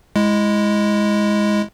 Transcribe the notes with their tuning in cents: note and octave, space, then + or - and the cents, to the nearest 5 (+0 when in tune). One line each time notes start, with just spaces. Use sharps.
G#3 +0 E4 +0